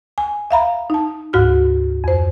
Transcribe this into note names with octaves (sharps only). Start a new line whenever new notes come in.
G#5
E5 F5 A#5 B5
D#4 A5
D2 G#2 F#4 F6
F2 C5